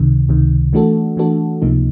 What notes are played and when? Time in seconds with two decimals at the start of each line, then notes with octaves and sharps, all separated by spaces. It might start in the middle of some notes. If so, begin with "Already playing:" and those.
Already playing: C#2 C3 D#3
0.29 C#2 C3 D#3
0.73 E3 A3 D4 F#4 A4
1.17 E3 A3 D4 F#4 A4
1.62 C#2 C3 F3 A#3 D#4